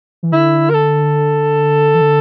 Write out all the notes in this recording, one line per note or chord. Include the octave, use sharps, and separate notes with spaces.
E3
D3 E4
A#4
A4
E3
D3